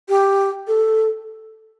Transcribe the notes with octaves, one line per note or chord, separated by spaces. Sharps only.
G4
A4